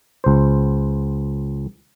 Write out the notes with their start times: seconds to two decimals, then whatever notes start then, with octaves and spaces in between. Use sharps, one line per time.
0.24 C#2 C5